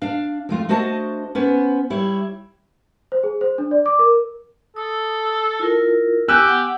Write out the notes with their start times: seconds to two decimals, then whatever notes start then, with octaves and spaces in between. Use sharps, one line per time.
0.02 D4 F5
0.49 F2 A3 F4
0.69 A3 D4 F#4 C5 D#5 A5
1.35 B3 C#4 C5
1.90 G3 E4 C#5
3.12 C5
3.23 G#4
3.41 C5
3.58 D4
3.71 D5
3.86 D6
3.99 A#4
4.76 A4 D#6
5.59 E4 F4 A#4
6.28 B3 G4 G#5 E6 F#6
6.48 F#5